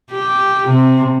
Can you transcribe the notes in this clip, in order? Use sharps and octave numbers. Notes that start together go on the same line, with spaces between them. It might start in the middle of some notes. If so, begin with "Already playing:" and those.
G4
C3